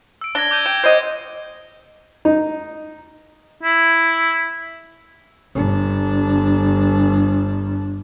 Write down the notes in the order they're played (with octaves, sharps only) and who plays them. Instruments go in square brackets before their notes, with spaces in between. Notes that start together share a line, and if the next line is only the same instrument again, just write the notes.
[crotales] E6 D7
[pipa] D4 [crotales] G#6 A#6 G7
[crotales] D6 G6 D#7
[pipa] G5 [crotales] G#6 D7 E7
[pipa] C5 D#5 F#5 [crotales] G6
[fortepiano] D#4
[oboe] E4
[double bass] G1 D4